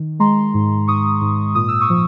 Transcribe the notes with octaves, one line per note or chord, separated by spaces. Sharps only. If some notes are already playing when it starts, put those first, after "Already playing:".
Already playing: D#3
G#3 A#5 C6
G#2
G#2 C#6 D#6
G#2
A#2 D#6
E6
C#6 D#6
F3